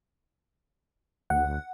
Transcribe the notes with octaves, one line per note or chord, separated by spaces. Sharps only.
D2 F#5